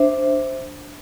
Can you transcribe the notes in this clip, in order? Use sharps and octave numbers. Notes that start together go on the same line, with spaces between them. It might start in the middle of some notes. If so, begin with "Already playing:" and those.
Already playing: D4 C5 E5